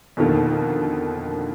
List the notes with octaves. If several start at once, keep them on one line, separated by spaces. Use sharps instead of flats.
F2 B2 D3 D#3 A#3